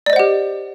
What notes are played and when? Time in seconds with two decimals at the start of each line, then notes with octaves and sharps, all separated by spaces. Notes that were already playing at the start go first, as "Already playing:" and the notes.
0.06 D5
0.10 D#5
0.13 C5
0.16 F#5
0.19 G4